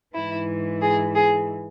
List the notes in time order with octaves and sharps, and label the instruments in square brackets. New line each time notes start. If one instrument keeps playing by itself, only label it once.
[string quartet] G#2 E3 E4
G#4
G#4